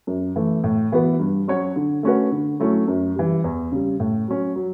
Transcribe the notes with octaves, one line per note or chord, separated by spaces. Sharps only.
F#2
E3 A3
A2
E3 B3 F#4 B4
G2
F#3 C#4 F#4 C#5
D3
A3 C#4 F#4 B4
D3
F#3 A3 C#4 E4
F#2
E3 G3
E2
C#3 G3
A2
F#3 C#4
F#3